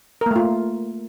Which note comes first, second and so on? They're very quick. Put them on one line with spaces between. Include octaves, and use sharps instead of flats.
A#4 A#3 A3 F4